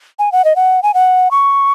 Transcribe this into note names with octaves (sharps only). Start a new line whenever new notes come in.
G#5
F#5
D#5
F#5
G#5
F#5
C#6